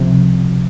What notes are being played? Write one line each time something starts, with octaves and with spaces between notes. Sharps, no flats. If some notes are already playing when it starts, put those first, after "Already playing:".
Already playing: C#2 C3 F3